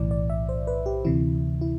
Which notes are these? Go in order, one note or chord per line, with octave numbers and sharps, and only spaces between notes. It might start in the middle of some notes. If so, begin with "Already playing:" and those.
Already playing: B1 A2 E3 D5
D5
E5
C5
B4
G4
D2 C3 E3 E4
E4